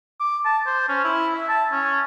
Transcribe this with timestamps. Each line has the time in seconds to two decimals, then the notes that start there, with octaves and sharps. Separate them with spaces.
0.20 D6
0.45 A5
0.66 C5
0.89 C#4
1.04 E4
1.35 E5
1.48 A5
1.72 C#4